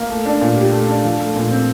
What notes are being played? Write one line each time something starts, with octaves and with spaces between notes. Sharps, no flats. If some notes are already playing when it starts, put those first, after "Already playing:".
Already playing: A#3
A3
D4
A#2
G4
A3
D4
F3
A3
A#2
C4